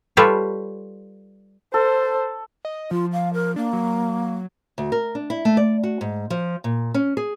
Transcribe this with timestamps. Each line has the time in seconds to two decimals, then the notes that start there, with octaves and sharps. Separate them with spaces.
0.17 G3 F4 G4 A4 B4 C#5
1.74 A4 C5
2.65 D#5
2.91 F3 F4
3.12 F5
3.33 A#4
3.56 A#3 D4
3.73 F#3
4.78 D2
4.92 A#4
5.15 D4
5.30 E4
5.45 A3
5.57 D5
5.83 F#4
6.01 G#2
6.30 F3
6.64 A#2
6.94 C#4
7.17 G#4